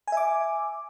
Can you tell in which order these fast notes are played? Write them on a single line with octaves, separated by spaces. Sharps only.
G#5 E5 D6